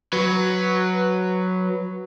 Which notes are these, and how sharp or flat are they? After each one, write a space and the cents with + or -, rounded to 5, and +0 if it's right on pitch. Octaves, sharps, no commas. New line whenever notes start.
F#3 +0 B4 +0